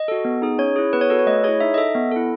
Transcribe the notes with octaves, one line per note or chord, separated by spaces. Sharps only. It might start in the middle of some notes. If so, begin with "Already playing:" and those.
Already playing: D#5
F#4 A4
B3
D#4 G#4
C#4 C#5
E4 G#4
B3 B4
C#5
F#4 A4 B4
C#5
A3 D#5
E4 G#4 C#5
D#4 E5
D#5
A4 E5
B3
E4 A4